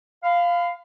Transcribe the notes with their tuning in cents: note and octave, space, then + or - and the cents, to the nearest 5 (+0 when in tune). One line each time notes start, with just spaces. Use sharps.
F5 +0 B5 +35